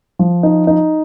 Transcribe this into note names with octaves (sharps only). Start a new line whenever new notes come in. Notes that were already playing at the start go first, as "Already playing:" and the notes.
F3
D#4
D#4